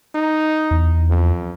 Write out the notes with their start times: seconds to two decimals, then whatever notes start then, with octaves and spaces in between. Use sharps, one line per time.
0.15 D#4
0.71 E2
1.09 F2